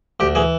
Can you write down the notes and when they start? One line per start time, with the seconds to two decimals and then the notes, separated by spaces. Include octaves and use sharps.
0.20 D2 G4
0.35 E3 G#4